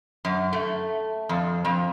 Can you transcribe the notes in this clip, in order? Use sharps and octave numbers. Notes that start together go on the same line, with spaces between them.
F#2
A3
F2
F2